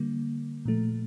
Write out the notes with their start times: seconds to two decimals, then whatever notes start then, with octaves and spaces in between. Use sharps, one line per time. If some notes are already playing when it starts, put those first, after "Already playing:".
Already playing: D3 G3 A#3
0.65 A#2 F3 A3